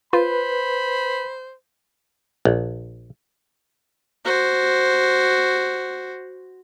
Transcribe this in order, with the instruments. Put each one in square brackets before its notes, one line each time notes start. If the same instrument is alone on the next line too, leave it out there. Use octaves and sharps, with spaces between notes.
[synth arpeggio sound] F4 [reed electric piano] B4 [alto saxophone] C5 [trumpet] B5
[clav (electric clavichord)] A#1
[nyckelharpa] F#4 C5